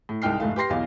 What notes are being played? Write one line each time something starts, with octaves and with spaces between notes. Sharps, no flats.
A2
C2 G#3 D#4 G5 F6 C7
F1 G#2 A3 F5
G4 B4 G5 C6 A#6 C7
B1 E2 F5